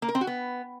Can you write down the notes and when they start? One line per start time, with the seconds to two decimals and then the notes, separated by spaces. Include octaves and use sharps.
0.02 A#3
0.09 A#4
0.15 C4
0.21 F#4
0.27 B3